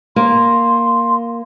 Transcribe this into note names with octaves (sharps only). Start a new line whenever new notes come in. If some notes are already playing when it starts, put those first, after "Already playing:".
A#3 C6